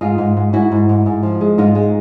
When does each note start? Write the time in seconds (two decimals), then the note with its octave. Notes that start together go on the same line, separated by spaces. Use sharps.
0.01 G#2 D#4 F4
0.18 G#2
0.37 G#2
0.53 G#2 E4 F#4
0.72 G#2
0.89 G#2
1.06 G#2
1.23 F3
1.41 G#3
1.58 G#2 D#4 F4
1.75 G#3